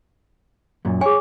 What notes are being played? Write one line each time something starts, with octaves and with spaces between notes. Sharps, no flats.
F#2 A#2
G#4 C#5 G#5